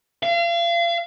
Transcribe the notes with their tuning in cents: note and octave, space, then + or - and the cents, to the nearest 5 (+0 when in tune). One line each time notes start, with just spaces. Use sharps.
F5 -35